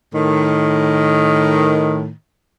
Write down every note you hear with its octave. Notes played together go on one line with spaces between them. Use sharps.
A2 D#3